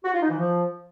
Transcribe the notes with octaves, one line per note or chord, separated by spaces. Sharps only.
F#4
F4
D#4
E3
F3